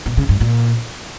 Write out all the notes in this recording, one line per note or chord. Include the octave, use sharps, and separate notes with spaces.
B2
C#3
G2
A#2